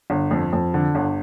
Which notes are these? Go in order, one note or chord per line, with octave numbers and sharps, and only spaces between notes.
G1
F2
F2
D3
G1